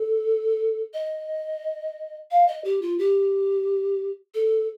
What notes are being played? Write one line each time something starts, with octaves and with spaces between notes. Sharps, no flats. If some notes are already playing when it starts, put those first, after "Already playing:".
Already playing: A4
D#5
F5
D#5
G4
F4
G4
A4